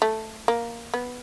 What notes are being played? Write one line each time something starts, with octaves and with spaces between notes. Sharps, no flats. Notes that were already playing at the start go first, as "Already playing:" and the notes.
A3
A#3
B3